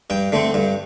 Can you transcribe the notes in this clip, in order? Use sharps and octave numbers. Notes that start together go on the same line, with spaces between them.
G2 G5
D3 A3 C4
G2